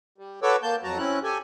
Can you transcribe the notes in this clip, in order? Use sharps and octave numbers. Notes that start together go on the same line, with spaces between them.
G3
F#4 A4 B4 C#5 D6 E6
A#3 A5 G6
F2 F#3 F#4 A5 A#5
C4 C#4 E4 F#6
G4 A4 G#5